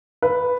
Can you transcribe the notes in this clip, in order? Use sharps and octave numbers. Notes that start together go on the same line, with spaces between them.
B4